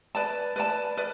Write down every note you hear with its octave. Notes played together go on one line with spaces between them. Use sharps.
B4 D5 A5
B4 D5 A5
B4 D5